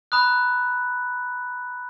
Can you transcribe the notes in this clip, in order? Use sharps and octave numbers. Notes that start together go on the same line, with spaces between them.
A#5 B5 D#6 F#6